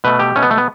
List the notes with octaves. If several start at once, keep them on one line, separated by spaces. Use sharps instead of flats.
B2 A3 B4
G4
B2 A3 C#4
B3
A3
B3